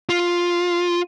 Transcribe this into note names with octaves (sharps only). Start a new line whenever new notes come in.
F4